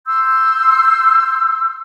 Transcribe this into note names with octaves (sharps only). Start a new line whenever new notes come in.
C6 E6 G6